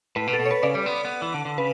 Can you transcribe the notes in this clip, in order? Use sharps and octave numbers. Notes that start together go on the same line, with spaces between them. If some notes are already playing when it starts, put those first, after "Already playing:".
A2 B4
B2
A4
B2
C#5
B4
C#3 D5
G3 D5
B3
B3
E3
D3
D3
C#3 B4